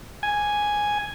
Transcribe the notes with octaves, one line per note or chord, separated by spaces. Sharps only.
G#5